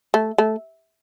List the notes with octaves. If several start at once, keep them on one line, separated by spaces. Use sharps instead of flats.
A3
A3